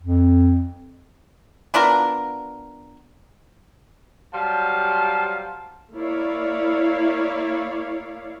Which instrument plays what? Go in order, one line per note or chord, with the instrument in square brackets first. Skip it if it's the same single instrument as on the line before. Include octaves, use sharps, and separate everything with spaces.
[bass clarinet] F2
[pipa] B3 D4 F4 A#4
[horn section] F#3 G3 C5 F5 A5
[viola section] A#3 E4 C#5 D5 F5